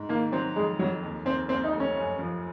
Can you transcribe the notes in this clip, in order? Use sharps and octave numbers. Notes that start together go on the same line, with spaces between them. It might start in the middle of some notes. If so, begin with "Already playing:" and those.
Already playing: G#2
D#3 A#3
F#3 C4
F2 G#3
F2 F#3
D#2
D#2 C4
D#2 C4
D#4
F1
C#4
F#2
F3